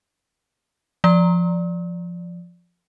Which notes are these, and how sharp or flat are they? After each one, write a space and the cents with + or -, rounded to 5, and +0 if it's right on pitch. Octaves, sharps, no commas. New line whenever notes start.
F3 +0 D5 +0